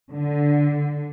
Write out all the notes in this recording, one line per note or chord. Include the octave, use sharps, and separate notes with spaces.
D3